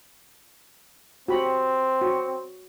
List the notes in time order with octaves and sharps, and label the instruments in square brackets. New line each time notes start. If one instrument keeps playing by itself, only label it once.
[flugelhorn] C4 [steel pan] F#4 G4 B5
[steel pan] F#4